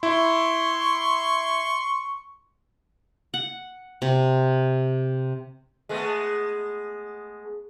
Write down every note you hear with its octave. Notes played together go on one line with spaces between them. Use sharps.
E4 C6 C#6
F#5
C3
G#3 A3 B3